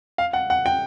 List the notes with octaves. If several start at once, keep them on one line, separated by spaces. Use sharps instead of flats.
F5
F#5
F#5
G5